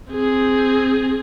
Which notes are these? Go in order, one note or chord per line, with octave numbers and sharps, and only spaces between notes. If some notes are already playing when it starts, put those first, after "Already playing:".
C4 G#4